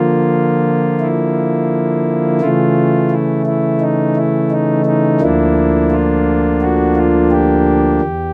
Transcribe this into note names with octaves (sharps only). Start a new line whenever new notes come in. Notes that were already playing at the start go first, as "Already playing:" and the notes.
Already playing: D3 F3 A#3 F4
E4
C#3 E3 A3 F4
E4
E4
D#4
E4
D#4
D#4
D2 D3 F3 A#3 D4 E4
F4
F#4
F4
G4
E2